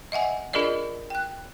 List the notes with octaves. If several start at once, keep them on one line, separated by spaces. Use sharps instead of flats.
D#5 E5 F#5 G#5
D4 F4 G#4 A#4 D5 D#5
G5 F#6